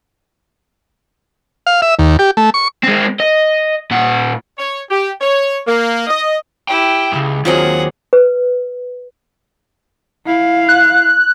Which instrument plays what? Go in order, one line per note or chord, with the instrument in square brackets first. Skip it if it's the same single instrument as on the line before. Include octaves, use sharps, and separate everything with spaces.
[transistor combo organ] F5
E5
D#2
G4
A3
C#6
[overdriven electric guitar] G#3 C4
D#5
A#2 F#5
[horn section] C#5
G4
C#5
A#3
D#5
[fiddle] E4 G4 [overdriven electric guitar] G5
[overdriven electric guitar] C#2 F#2
[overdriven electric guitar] D#2 [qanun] F#3 C4 F4 [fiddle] G#4 F#5
[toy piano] B4
[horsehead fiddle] E4 F5
[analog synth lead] F#6